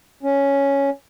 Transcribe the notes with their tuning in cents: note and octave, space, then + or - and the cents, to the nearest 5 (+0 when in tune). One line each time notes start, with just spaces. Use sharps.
C#4 +5